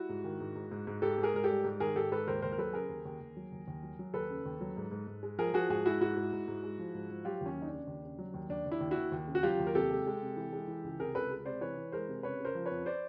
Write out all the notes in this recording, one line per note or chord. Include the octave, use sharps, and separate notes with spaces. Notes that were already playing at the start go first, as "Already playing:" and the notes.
Already playing: G3 E4 F#4
G#2
D#3
G#2
G#2
G#2
G#2
G#2 G4 A4
G#2
G#4 A#4
G#2 A#4
G4 A4
G3
G#2
D#3 G#4 A#4
G#2 G4 A4
G#2 A4 B4
D#2 A#4 C5
D#2 A#4 C5
A#4
F#3 A4 B4
C#3 G#4 A#4
D#2
D#2
D#2
F#3
D#2
D#2
F#3
F#3
D#2 A4 B4
C#3
D#2
F#3
G#2
G#2
G#2
G#3
F3 G#4 A#4
F3 F#4 G#4
G#2 F#4 G#4
G#3 E4 F#4
G#2 E4 F#4
G#2
G#2
G#2
G#3
F3
G#2
F3
F#3 F4 G4
D#2 C#4
C#3
D#4
D4
C#3
D#2
C#3
F#3
D#2
D#2 D4
D#2
D4 E4
D#2
E4 F#4
D#2
D#2
C#3
F#4
F#3 F4 G4
D#2
A#4
C3 G4 A4
G#3
G#3
C3
E3
G#3
E3
C#2
C3 G#4 A#4
C#2 A4 B4
G#3
C3 C5 D5
E3 B4 C#5
E3
G#3 A#4 C5
C3
C#3 B4 C#5
C#3 A#4 C5
F3
B4 C#5
F2
C5 D5